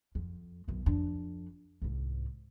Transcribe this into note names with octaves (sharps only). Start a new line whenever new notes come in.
F2
B1 F#2
F2 D4
C2 G#2